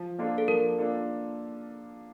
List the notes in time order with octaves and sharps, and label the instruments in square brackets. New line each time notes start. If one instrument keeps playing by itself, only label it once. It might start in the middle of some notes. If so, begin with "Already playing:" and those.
Already playing: [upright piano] F3
A#3 D4 F4 A4
[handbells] A4
[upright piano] F3 [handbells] A#4
[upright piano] A#3 D4 F4 A4